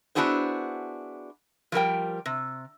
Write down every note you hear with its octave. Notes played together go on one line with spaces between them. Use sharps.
B3 D4 E4 F#4 G#4 C5
F3 G3 A#4 G5
C3